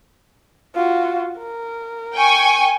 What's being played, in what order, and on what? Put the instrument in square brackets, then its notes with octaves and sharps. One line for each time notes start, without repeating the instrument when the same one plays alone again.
[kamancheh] F4 F#4
A#4
[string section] G5 G#5 C#6